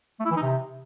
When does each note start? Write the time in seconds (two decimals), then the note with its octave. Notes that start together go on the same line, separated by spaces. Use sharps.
0.20 A3
0.25 E4
0.31 E3
0.37 D#4
0.42 C3